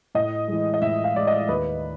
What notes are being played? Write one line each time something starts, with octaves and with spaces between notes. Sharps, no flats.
A2 D#5
E3 G#3
D#5
A2 E5
F5
E3 G#3 D5
D#5
D#2 B4